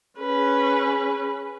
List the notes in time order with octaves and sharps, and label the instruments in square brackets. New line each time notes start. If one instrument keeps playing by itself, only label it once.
[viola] C#4 B4 [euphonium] G#4